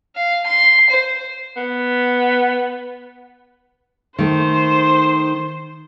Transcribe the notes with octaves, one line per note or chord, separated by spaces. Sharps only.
F5
C6
C5
B3
D#3 A3 C5